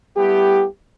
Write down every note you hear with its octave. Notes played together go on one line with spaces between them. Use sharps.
G3 A3 B3 E4 G4